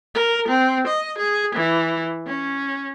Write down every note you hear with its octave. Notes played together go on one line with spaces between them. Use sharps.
A#4
C4
D#5
G#4
E3
C#4